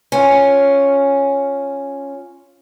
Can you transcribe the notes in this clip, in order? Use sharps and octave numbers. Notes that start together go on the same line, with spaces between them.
C#4 F4